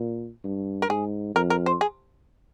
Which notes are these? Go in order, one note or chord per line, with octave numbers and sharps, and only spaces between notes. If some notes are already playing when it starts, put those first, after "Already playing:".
Already playing: A#2
G2
A#4
G#2 G#4
F2 A#4
A#4
C5
G#4